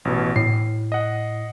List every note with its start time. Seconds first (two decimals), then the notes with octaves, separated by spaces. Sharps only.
0.05 A1 B2
0.36 A2 C7
0.92 D#5 F#5